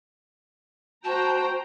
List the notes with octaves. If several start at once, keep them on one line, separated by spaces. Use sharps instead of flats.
F#4 C5 G5 A5 A#5